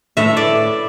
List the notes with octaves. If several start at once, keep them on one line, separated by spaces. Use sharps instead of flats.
A2 E5
D5